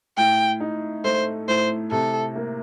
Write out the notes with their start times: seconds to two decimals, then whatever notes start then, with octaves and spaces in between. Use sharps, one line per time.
0.17 A2 G5
0.60 D#4
1.04 A3 C5
1.48 A2 C5
1.91 C3 A4
2.36 A#3